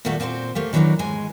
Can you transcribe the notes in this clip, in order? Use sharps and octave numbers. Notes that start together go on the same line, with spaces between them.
A#2 D#3 G3 A3 F#4 A4
A#2 C4 F#4 G#4 C5
A3 A#3 G4
D#3 E3 F#3 A3 D4 D#4
G#2 G#3 G#5